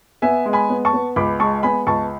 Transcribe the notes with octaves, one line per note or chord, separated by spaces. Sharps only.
B3 E5 G#5
G#3
G#5 B5
B3
A5 C#6
B3
C#2 B5 D6
G#3 A5 C#6
B3 G#5 B5
C#2 A5 C#6